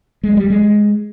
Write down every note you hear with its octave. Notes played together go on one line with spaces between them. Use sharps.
G#3
G3
G#3